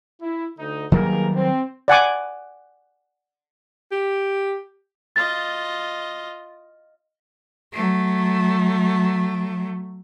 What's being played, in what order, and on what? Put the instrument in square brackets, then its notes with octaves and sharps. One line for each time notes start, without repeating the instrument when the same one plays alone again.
[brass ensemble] E4
D2 D3 D#4
[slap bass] D#3 F#3 G3 [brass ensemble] A#3 G#4 A#4
[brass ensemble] C4
[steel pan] D5 F#5 G#5 D6
[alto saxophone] G4
[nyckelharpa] F4 D#5 [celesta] A6
[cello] F#3 A3